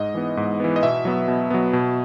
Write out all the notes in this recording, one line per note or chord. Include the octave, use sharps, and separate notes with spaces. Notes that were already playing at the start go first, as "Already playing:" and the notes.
Already playing: G#2 D#5
E3 B3
G#2
E3 B3
D#5
B2 E5
F#3 B3
B2
F#3 B3
B2